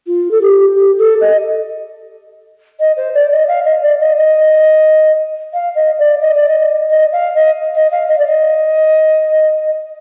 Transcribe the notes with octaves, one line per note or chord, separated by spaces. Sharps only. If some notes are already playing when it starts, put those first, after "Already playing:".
F4
A4
G4
G4
A4
D#5
D#5
C5
D5
D#5
F5
D#5
D5
D#5
D#5
F5
D#5
D5
D#5
D5
D#5
D#5
F5
D#5
D#5
F5
D#5
D5
D#5